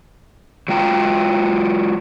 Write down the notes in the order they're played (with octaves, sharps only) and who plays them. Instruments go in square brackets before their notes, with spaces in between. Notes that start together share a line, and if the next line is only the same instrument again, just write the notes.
[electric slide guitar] F#3 G#3 F4 G5 A#5